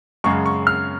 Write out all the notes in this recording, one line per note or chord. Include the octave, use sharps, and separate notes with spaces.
F#2 C#3 G#3 C#6
C#6
F6